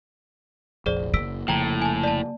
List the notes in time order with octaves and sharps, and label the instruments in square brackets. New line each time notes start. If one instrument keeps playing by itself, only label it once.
[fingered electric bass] F1 A#1 F2 [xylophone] G#4 C5 D5
[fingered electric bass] F#1 [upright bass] A#3 [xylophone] E6 B6 D7
[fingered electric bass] F1 C#3 F3 [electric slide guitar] A2 [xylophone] G5 A#5
[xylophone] G#5 A5
D5 A5